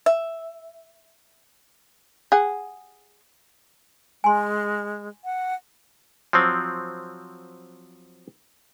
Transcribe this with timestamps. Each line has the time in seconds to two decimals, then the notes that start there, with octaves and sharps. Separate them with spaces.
0.06 E5
2.32 G#4 F#5
4.24 G#3 G#5 C6
5.25 F#5
6.33 F3 F#3 C4